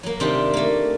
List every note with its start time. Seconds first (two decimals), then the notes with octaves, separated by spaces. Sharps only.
0.03 F#3 A#3
0.20 C3 D#3 C4 D4 F4 G4
0.53 A3 A#3